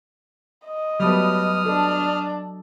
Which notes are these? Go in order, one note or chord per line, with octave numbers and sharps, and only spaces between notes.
D#5
F#3 G3 A3 B3 D#6 F6
D4 A4